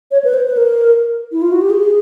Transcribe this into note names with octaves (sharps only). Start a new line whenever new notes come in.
C#5
B4
C5
B4
A#4
E4
F4
F#4
G4
G#4